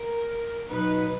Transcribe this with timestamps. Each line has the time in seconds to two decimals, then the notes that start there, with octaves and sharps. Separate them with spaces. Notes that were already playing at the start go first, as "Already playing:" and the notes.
Already playing: A#4
0.68 B2 F#3 B3 D#4 B4